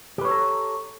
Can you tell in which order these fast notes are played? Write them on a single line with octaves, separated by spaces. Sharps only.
G4 B4 C#5 A4 A#5